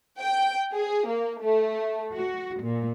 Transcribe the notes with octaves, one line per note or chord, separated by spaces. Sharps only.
G5
G#4
A#3
A3
F#4
A#2